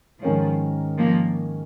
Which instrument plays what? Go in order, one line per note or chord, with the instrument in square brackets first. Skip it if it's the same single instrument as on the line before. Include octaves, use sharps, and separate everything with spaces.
[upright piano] G#2 D#3 C#4 A#4 C#5 [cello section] F3
[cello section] F3 A#3